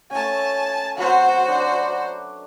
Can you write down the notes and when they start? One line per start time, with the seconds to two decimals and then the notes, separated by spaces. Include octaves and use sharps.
0.11 A3 C#4 G#5 A5
0.97 F#3 C4 F#4 C5
1.48 D4 B4 D5